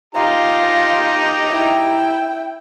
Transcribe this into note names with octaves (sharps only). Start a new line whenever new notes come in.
D#4 F4 G4 A#5 C6
E4 G5